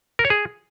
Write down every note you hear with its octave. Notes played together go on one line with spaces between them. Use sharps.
A#4
C#5
G#4